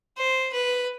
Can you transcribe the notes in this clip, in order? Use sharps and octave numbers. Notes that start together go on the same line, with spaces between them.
C5
B4